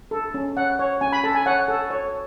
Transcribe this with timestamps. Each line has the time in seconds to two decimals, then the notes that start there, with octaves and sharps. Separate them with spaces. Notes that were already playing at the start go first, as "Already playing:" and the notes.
0.11 A4
0.34 C#4
0.57 C#5 F#5
0.79 C#5
1.01 C#4 G#5
1.12 B5
1.24 A4 A5
1.35 G#5
1.46 C#5 F#5
1.68 A4
1.91 C#5